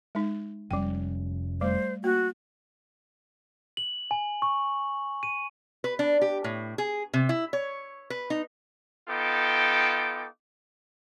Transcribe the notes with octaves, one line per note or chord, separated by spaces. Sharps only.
G#3 D#4
F1 G3 C#4 G5
G3 A3 C5
A#3 F#4
F#7
G#5
C#6
D#7
B4
D4
G4
A2
G#4
C3
E4
C#5
B4
D#4
B3 D#4 F4 A4 G5 D6